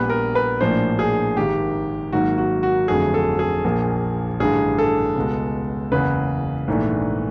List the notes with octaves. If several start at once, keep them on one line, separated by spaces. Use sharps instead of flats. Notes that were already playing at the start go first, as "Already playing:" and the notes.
Already playing: A#1 A#2 G3 B3 B4
A#4
B4
A#1 A2 F3 A#3 D4 C5
G#4
G#1 G#2 D#3 G4
G#1 G#2 D#3 F#3 A#3 F#4
F#4
F#4
G1 F2 D3 F#3 A3 G#4
A4
G#4
A#1 A#2 F3 A#3
A1 G2 D3 G#4
A4
C#2 B2 G#3
F#1 E2 C#3 B4
A#1 G#2 E3 A3 D4